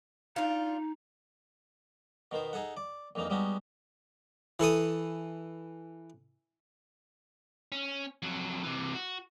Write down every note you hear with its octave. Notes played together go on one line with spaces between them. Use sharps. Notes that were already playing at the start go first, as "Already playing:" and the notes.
D4 D#4 F4
B2 D#3 B3 C5
D#4 G#4 A4 F#5
D5
A#1 F2 E3 A#3 D#4
G3 G#3 B3 C#4 D#4 F#4
E3 A4 C#6 D#6
C#4
F2 F#3
C3 E3
F#4